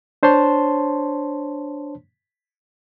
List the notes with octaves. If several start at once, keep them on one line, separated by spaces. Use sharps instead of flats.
D4 C5 C#5 A5 C6